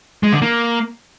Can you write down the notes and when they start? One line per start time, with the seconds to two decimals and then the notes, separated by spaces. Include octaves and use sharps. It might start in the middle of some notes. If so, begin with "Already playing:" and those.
0.23 G#3
0.33 D3
0.42 A#3